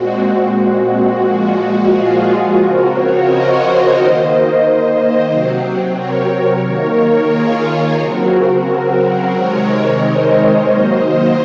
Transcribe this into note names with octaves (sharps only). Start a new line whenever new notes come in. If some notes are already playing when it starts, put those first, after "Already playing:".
Already playing: A#2 G#3 C4 F#4
F#4
F#4
A#2 F3 G#3
F4 G#4
C#3 F3 C4 F#4 A#4
A#4 C#5
C5 D#5
D#3 A#3
C3 F#3 C4
A#4 C#5
D#3 A#3
F4 G#4
C#3 F#3 C4 F#4 A#4
C3 D#3 G#3 C4 A#4 C#5
C5 D#5
D#3 F#3 A#3